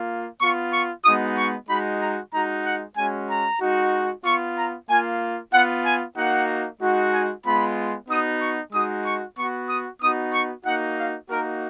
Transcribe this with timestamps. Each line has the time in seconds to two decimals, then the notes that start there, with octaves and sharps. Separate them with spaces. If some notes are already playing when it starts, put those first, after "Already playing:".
Already playing: A#3 F4
0.41 B3 F4 C#6
0.73 C#6
1.04 G#3 B3 D#4 F#4 D#6
1.37 C#6
1.69 G#3 D#4 F#4 B5
2.01 A#5
2.33 G#3 D#4 F#4 A#5
2.65 F#5
2.97 G#3 C#4 F#4 G#5
3.29 A#5
3.61 G#3 D#4 F#4
4.25 B3 F4 C#6
4.57 A#5
4.90 A#3 F4 G#5
5.53 B3 F4 F#5
5.85 G#5
6.17 A#3 D#4 F#4 F#5
6.82 G#3 D#4 F#4
7.13 G#5
7.45 G#3 B3 F4 B5
8.09 B3 D#4 F#4 D#6
8.41 C#6
8.73 G#3 D#4 F#4 D#6
9.06 C#6
9.37 B3 F#4 C#6
9.69 D#6
10.02 B3 D#4 F#4 D#6
10.34 C#6
10.66 A#3 D#4 F#4 F#5
10.98 F5
11.29 A#3 D#4 F#4 A#4